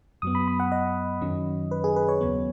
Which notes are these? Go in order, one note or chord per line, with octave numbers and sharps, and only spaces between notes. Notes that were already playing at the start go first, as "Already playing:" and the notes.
F#2 F#3 B3 D#6
B5
B5
F#5
D#5
F#2 D#3 F#3 C#4
B4
G#4
B4
C#5
D#2 C#3 F#3 B3